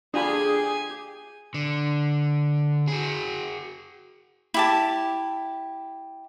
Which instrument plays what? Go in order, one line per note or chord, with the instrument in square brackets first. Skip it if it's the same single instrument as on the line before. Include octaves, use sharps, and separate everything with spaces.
[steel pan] D4 F4 B5 [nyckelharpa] G4 G#5 [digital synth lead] G#4
[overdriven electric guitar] D3
F#4 G#4
[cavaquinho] E4 G4 A5